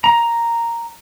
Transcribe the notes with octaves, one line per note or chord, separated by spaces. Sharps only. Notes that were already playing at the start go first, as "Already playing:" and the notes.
A#5